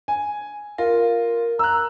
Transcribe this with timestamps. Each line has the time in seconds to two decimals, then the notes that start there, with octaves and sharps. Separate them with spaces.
0.08 G#5
0.78 F4 A#4
1.59 A#5 E6 F#6